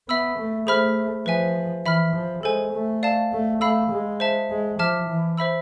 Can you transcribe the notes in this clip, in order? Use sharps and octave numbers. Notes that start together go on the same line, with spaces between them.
B3 E5 B5 E6
A3
A3 G#4 C5 E5 B5 F6
F3 B4 E5 G#5
E3 E5 B5 F6
F3
G#3 A4 C5 G#5
A3
D5 F5 A5
A3
A3 F5 B5 E6
G#3
C5 E5 A5
G#3
F3 E5 A5 D6 F6
E3
C5 E5 B5 E6